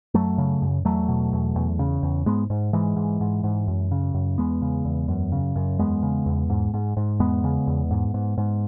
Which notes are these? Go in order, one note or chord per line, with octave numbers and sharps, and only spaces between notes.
F#2 F#3 A3
C#3
F#2
E2 F#3 A3
B2
E2
E2
C#3
E2
G#2 G#3 B3
G#2
G#2 E3 G#3
G#2
G#2
G#2
F#2
C#3
F#2
E2 G#3 B3
C#3
E2
F#2
C#3
F#2
E2 G#3 B3
C#3
E2
G#2
G#2
G#2
E2 G#3 B3
C#3
E2
G#2
G#2
G#2